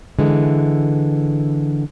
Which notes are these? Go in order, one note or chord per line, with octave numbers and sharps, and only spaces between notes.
D3 E3 G#3